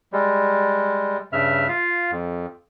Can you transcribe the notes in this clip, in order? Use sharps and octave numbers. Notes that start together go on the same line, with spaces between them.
G3 G#3
G2 C#3 E5 F6
F4 F5
F2